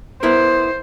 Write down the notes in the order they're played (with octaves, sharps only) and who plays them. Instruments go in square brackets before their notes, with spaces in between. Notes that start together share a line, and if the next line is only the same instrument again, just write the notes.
[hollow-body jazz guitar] B3 E4 A#4 [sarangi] C5